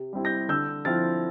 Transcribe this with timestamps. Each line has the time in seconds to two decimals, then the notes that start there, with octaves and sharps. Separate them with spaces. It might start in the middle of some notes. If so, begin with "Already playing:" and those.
Already playing: C3
0.13 G3 C4 E4
0.25 G6 A#6
0.49 D3 E6 G6
0.85 F3 C4 E4 F6 A6